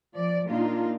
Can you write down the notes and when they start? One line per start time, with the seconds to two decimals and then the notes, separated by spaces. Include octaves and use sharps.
0.16 F3 D5
0.48 A#2 A#3 D4 D#4 F4